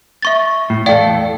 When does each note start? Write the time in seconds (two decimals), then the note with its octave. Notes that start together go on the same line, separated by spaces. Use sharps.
0.22 E5 C#6 A6
0.70 A2
0.86 E2 A2 A4 D5 F5 G5